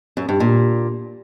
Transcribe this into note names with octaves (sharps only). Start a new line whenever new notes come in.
F#2
G2
A#2